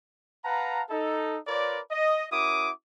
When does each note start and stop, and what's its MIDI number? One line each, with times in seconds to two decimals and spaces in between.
0.45 0.82 71
0.45 0.82 77
0.45 0.82 78
0.45 0.82 81
0.45 0.82 82
0.90 1.37 63
0.90 1.37 69
1.46 1.80 65
1.46 1.80 70
1.46 1.80 71
1.46 1.80 73
1.46 1.80 74
1.91 2.25 75
2.31 2.70 61
2.31 2.70 64
2.31 2.70 66
2.31 2.70 70
2.31 2.70 86
2.31 2.70 87